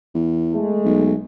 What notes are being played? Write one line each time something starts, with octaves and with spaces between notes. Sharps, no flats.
E2
G#3 A3
B1